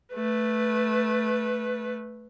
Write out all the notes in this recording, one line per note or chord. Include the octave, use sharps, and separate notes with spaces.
A3 B4